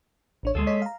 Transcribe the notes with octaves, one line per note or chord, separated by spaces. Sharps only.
A1 D4 C#5
D2 G#3 G#4 A4
C#5 D#5 B6
F5 A#5